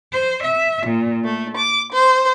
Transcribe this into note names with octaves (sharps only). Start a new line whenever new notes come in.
C5
E5
A#2
A3
D6
C5